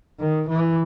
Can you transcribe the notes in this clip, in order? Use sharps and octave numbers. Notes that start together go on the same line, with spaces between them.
D#3
E3